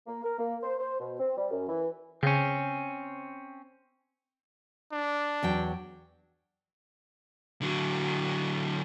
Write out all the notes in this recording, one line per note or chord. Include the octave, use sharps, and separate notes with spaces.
A#3
A#4
A#3
C5
C5
B2
C4
G3
F#2
E3
C#3 C4 C#4
D4
E2 F#3 G5
D3 F#3